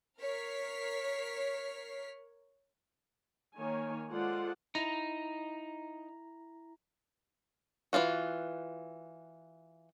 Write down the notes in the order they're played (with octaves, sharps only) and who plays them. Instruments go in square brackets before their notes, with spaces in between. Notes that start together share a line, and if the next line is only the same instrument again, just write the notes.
[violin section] A#4 C#5 F6 B6 C7
[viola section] D#3 A#3 D#4 C#5 G#5
G#3 F4 A4 C5 D5 F#5
[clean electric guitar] D#4 [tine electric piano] E4 A#5
[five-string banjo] E3 G#3 F4 F#4